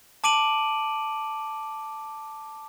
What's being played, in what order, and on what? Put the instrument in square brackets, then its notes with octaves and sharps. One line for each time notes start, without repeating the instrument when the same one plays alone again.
[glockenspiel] A5 D6 D7 D#7 F#7